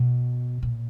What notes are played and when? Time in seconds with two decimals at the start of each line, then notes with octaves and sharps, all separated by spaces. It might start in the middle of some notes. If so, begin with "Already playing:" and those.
Already playing: B2
0.63 A#2